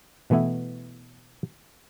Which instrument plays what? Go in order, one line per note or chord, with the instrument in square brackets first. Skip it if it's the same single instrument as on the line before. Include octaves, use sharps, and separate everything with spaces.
[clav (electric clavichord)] B2 E3 A3 B3 E4